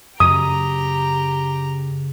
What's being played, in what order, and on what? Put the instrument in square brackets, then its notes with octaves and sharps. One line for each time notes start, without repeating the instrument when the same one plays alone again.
[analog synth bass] F#2 [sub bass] C#3 [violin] G4 A#5 [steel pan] D#6